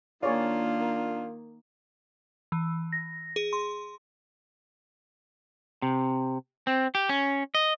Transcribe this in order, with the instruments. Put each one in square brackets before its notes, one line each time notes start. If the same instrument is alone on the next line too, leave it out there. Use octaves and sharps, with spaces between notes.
[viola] D#3 A#3 [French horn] D4 [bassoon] F4 [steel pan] G#4 C#5 D5
[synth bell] E3
A#6
G#4
C6
[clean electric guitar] C3
C4
G4
C#4
D#5